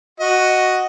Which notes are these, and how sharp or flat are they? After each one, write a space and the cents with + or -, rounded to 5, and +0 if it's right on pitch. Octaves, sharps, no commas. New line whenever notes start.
F#4 +0 D#5 +0